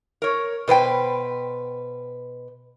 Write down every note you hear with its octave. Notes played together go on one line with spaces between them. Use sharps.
A#4 C#5
B2 B4 C5 G5